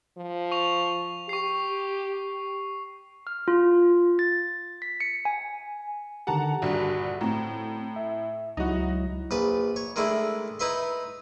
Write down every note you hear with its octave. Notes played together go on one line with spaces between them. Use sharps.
F3
C#6 F7
G4 C#6 C7
F6
F4
A6
B6
C#7
G#5
D3 D#3 G4 F#5 A5 A#5
A#1 G2 D3 F#4
A2 C4 A#5
E5
C#2 F#3 D#4 E4 F#4
A#1 B4 A5
C#5
D#3 G#3 A3 D4 E4
D#4 E4 B4 E5 C6